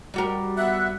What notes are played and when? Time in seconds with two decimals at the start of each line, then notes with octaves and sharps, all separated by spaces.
0.14 G3 F#4 A#4
0.57 B3 E5 F#6